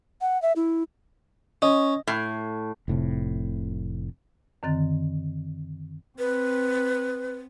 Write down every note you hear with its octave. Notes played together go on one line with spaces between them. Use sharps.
F#5
E5
E4
C#4 D#5
A2
F1 A2 C3
F#2 D3 D#3 C4 A6
C4 B4